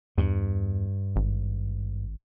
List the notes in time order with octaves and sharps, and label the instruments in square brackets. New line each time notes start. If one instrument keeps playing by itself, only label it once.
[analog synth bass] E2 [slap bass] G2
[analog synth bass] G#1